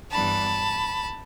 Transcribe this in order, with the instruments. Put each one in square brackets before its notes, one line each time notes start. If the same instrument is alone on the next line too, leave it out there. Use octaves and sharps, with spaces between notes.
[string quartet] G2 E3 G3 B3 D4 A5 B5